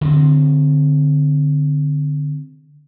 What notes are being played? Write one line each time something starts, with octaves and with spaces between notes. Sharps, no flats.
D3 C4